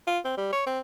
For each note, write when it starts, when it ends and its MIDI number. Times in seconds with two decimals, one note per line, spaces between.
0.08 0.19 65
0.25 0.35 60
0.37 0.53 55
0.53 0.62 73
0.67 0.80 60